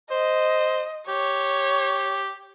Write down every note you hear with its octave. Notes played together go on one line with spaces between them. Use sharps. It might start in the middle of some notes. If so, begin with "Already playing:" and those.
C5 D#5
G4 C#5